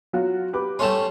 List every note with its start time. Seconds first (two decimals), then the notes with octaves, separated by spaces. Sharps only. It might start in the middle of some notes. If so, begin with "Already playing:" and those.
0.13 F#3 F4 F#4
0.53 G4 B4 D6
0.79 G3 A3 C#4 C6 E7